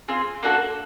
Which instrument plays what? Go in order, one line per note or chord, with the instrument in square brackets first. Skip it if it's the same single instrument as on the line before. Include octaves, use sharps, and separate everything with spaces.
[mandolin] C4 F4 G#4
A#3 D4 F#4 A4